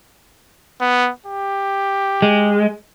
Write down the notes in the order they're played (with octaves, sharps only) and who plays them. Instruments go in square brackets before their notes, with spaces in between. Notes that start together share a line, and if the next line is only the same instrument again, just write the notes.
[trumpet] B3
G4
[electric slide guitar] G#3